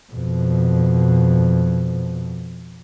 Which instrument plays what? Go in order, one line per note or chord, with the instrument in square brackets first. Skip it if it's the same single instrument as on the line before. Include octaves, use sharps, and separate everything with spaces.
[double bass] F2 B2